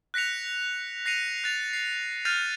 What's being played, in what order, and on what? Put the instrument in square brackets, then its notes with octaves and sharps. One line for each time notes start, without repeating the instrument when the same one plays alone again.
[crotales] F#6 A#6 B6 C#7 F7
F#6 A#6 C7 C#7 D#7 F7
F#6 A6 F7
C7
F6 G6 A6 C7 D#7 F7